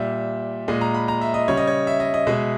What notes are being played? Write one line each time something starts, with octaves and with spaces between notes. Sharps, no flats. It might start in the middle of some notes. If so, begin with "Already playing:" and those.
Already playing: A#2 G3 E5
A#2 G#3 D#5
A#5
B5
A#5
E5
D#5
C#3 G3 C#5
D#5
C#5
E5
D#5
D#5
B2 G#3 E5